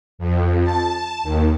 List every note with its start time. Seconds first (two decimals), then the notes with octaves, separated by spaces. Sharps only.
0.18 F2
0.63 A5
1.23 D#2